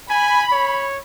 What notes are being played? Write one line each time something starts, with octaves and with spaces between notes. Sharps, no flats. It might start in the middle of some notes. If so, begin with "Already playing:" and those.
G#5 B5
C#5